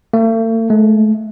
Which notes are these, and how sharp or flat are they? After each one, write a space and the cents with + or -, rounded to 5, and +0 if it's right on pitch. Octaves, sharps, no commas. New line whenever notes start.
A3 +45
A3 -35